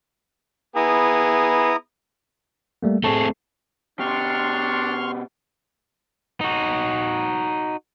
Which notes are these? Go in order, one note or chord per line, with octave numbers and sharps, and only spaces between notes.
B3 E4 G#4 A#5 D#6
G3 A3 A#3
A3 C4 G#4 A4 A5 C#6
B2 D4 G4 C6 C#6 F6
D#4 F#4